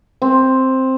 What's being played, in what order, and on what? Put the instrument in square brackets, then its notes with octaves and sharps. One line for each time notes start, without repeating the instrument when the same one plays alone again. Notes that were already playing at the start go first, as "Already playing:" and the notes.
[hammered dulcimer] C4